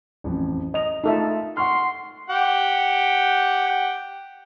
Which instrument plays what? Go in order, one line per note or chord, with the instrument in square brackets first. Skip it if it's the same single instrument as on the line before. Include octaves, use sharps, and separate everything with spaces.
[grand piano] A1 F2
[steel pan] D#5 [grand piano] D#6 F7
[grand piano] A3 F4 [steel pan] D#4 A4 E5
[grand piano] F#5 C#6 F6 [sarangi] C6
[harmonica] G4 F#5 G5